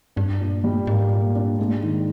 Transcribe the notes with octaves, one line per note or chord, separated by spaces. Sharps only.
G2 D4
A#2
G3
G#2 A#3
A#2
D4
G#3
D#3